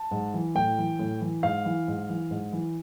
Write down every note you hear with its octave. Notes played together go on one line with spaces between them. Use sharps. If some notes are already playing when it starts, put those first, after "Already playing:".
Already playing: A5
G#2
E3
A2 G5
E3
A2
E3
G#2 F5
E3
G#2
E3
G#2
E3